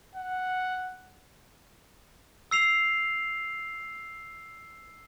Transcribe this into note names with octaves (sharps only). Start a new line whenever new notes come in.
F#5
E6 C7 F7